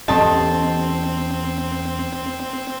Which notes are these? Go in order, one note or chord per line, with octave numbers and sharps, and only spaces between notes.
E2 C4 C#4 G4 A4 D#5 A5